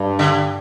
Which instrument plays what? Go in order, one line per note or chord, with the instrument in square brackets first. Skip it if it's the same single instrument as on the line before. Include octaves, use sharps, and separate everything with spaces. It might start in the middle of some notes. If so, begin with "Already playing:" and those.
Already playing: [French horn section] G2
[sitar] D3